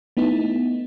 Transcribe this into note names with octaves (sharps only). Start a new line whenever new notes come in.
A3 B3 D#4 E4